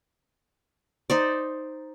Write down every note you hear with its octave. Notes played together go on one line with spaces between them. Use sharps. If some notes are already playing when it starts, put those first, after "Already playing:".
D#4 C5 D5